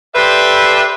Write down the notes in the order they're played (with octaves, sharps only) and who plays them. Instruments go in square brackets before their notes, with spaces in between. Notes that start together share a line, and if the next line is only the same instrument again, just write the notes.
[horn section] G4 A4 B4 C5 D5 E5